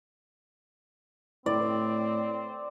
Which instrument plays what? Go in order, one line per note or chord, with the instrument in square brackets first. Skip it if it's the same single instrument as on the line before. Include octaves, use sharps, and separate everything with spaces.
[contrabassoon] A2 [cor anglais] C4 [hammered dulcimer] D5